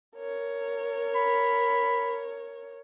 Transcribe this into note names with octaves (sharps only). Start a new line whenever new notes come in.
A#4 C#5
B5